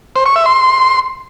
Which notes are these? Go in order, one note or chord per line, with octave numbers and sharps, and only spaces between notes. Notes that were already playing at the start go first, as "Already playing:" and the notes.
C5
C#6
E5
C6